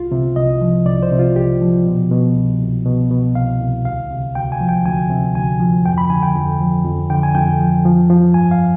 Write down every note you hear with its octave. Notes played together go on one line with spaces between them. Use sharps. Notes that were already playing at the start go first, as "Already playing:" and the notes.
Already playing: C2 F4
C3
C2 D#5
F3
C2 D5
C5
C3
F4
C2 G4
F3
B2
B2
C2
C2
B2
B2
C2 F5
C2
D2 F5
C3
D2 G5
G#5
F3
G5
D2 G#5
C3
D2 G#5
F3
F2 G5
B5
D3 G#5
G5
F2
F3
F2
D3 G5
G#5
F2 G5
F3
F3
F3
G2 G#5
F5